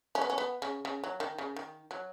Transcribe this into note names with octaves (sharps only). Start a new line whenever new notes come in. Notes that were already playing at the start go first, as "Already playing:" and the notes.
C#4
B3
C#4
B3
C#3
C#3
F#3
D#3
C#3
D#3
F#3